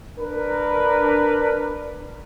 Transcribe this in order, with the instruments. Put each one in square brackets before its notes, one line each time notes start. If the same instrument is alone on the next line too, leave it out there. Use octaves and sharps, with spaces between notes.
[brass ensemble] D4 A#4 B4